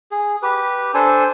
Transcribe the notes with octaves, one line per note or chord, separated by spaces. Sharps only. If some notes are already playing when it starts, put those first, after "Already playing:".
G#4
G4 B4
D4 A4 C5 G#5